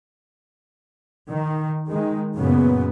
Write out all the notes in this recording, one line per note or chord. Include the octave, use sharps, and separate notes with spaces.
D#3
D#3 G#3
F#2 A#2 C#3 B3